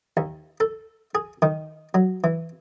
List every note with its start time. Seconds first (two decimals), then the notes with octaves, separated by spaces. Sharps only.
0.17 D#2
0.60 A4
1.15 G#4
1.42 D#3
1.94 F#3
2.24 E3